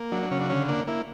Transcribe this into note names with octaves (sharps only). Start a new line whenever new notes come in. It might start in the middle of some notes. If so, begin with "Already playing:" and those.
Already playing: A#3
F#3 D4
D4
C#3 C#4
D4
D3 C#4
A#3 D4
A#3 E4